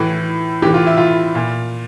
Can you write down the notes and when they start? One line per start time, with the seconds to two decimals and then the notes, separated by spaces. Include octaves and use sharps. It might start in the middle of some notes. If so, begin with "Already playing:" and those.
Already playing: A2 E3
0.62 A2 E3 G4
0.74 F4
0.87 E4
0.97 F4
1.35 A#2